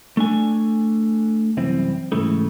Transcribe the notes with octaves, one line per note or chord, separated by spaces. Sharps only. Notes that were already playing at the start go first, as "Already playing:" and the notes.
A3 D4 G#5
C2 F#2 E3 C4
G#2 C#3 E3 A3